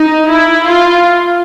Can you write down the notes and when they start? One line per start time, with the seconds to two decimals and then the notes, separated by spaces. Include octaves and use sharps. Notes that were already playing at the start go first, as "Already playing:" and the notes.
Already playing: D#4
0.28 E4
0.64 F4